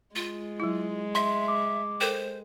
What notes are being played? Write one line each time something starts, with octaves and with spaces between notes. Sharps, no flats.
G#3 F4
F#3 E4
E5 C6
D6
A4 A#4 C5 G5